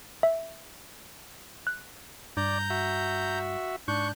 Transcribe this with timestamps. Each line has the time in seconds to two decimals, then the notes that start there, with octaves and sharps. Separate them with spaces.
0.23 E5
1.67 F#6
2.37 G2 D5 A#5 G6
2.70 F#4 E5
3.88 G#2 D4 C#6 F#6 G6